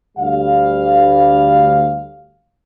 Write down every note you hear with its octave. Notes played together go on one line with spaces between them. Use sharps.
D2 G3 F5